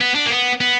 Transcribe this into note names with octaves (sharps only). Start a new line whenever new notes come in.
B3
D4
A#3
B3
B3